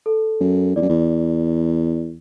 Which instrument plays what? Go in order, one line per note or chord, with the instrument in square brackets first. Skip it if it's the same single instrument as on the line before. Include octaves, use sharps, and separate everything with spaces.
[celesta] A4
[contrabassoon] F#2
[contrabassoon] E2 [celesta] D5
[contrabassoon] F#2
E2